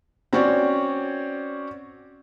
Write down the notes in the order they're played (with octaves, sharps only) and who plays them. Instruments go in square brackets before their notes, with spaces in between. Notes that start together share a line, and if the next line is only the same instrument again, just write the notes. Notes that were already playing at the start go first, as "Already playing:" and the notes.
[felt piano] C4 C#4 F#4 C#5 D5